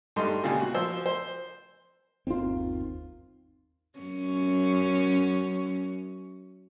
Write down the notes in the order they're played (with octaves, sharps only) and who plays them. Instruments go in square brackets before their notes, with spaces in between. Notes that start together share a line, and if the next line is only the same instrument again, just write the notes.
[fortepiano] G2 G3 A3 D#4 C6
A#2 C#3 G3 G#3
F#4
F3 C5 E6
C5
[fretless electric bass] G1 D#2 C4 [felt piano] D#3 F4
[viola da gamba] F#2 C#4